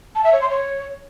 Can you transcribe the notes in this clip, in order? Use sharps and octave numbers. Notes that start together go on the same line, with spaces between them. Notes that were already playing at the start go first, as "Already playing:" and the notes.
A5
E5
C#5
C6
C#5